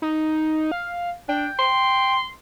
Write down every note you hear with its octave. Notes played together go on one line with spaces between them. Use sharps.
D#4
F5
D4 G5
C6